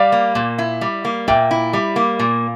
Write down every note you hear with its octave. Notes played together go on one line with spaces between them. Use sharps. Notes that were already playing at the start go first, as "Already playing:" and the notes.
Already playing: G3 D5 F5
A#3
A#2
E4
G3
A#3
A#2 E5 G5
E4
G3
A#3
A#2